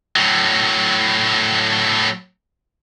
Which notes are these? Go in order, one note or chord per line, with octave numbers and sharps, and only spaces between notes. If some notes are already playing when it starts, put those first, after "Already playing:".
A2 F#3